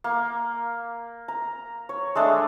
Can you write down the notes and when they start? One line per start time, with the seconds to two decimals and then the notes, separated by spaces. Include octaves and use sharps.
0.04 A#3
1.28 A#5
1.89 C#5
2.15 G#3 A3 D4